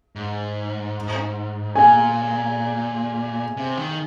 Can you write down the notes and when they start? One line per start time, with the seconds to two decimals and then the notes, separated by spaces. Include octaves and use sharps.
0.16 G#2
1.75 A#2 G#5
3.57 C3
3.77 D#3